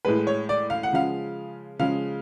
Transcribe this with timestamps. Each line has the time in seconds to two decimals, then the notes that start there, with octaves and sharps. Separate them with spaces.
0.05 A2 G#3 B4
0.27 C#5
0.49 D5
0.70 F5
0.83 F#5
0.93 C#3 F3 G#3 F5
1.79 C#3 F3 G#3 F5